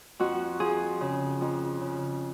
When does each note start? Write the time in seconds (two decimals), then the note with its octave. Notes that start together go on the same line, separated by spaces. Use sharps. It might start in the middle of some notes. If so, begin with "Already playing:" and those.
0.19 F2 F#4
0.60 F3 G#4
1.01 C#3
1.41 F2
1.81 C#3